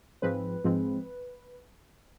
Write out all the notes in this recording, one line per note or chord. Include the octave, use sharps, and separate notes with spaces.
G#2 F3 G#3 C4 B4
G#2 F3 G#3 C4